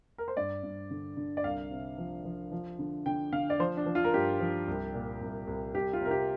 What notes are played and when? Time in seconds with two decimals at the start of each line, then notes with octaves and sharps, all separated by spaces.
0.18 A#4
0.28 C5
0.37 G2 D5
0.63 G2
0.91 D3
1.17 D3
1.37 D5
1.44 C2 F5
1.71 C3
1.98 F3
2.25 F3
2.52 F3
2.79 D3
3.06 D3 G5
3.33 D3 F5
3.50 D5
3.59 F3 C5
3.77 D4
3.86 F3
3.95 F4
4.04 A#4
4.14 G2 G4
4.40 F3
4.68 C2
4.94 A#2
5.21 C2
5.47 C2
5.74 C2 G4
5.93 F4
6.01 C3 A#4
6.11 G4